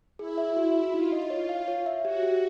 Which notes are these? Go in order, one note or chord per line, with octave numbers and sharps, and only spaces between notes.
E4 G#4
E5
F#4
F#4
D#4 F4
D#5
C#5
F5
C#5
E5
F#4 G4
G4